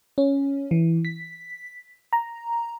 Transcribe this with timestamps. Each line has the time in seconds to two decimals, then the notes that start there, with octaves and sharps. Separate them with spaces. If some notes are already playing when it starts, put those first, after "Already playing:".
0.18 C#4
0.71 E3
1.05 B6
2.13 A#5